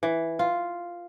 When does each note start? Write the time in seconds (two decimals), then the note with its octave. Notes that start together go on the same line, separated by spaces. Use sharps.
0.03 E3
0.39 F4